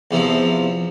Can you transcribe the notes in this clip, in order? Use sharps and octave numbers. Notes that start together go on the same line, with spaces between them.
E2 C3 F3